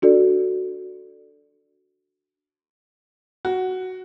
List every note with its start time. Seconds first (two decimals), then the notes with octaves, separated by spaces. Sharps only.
0.02 D4 F#4 A4 D5
3.45 F#4